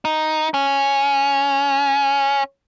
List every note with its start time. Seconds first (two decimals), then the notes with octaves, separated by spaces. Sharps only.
0.05 D#4
0.54 C#4